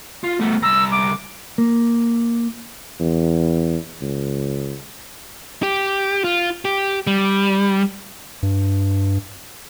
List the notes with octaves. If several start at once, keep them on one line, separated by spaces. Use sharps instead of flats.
F4
A3 B3
C2 A#5 E6
D6
A#3
E2
C#2
G4
F4
G4
G3
G2